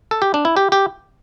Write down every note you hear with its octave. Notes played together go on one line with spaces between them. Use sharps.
A4
G4
D4
E4
G4
G4